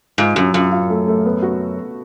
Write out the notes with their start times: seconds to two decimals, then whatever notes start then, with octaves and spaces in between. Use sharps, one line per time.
0.18 G#2 F4
0.36 F#2 F#3
0.54 F#2 F4
0.72 F4
0.90 A3
1.07 A3
1.26 B3
1.42 F#4